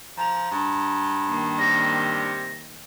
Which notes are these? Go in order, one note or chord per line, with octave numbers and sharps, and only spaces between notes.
F3 A#5 F7
G2
D#3 A#3
C3 G3 A#6